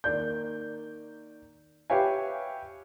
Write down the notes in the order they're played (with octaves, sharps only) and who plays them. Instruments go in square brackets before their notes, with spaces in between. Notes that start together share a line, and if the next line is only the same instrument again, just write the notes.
[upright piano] D#3 A#3 D5 G6
G4 B4 C#5 E5 F5 G#5